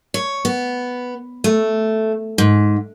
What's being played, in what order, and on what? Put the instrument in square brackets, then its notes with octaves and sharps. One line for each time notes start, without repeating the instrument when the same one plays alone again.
[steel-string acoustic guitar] C#5
B3
A3
G#2